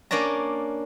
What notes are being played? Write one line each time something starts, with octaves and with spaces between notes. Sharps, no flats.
A#3 C#4 D4 D5 A#5